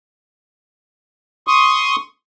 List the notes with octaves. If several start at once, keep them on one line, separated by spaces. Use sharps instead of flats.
C6 C#6 D#6